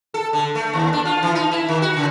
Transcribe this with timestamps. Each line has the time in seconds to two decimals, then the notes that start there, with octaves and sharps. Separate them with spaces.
0.14 A4
0.33 D3
0.55 A3
0.73 D#2
0.93 D4
1.05 F4
1.22 E3
1.35 D#4
1.51 E4
1.68 D#3
1.82 F#4
1.97 C#3